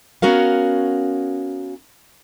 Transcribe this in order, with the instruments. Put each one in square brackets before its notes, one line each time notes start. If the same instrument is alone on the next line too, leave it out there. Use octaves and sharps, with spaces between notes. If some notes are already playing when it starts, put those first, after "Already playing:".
[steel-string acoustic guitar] B3 C#4 F#4 A#4 F5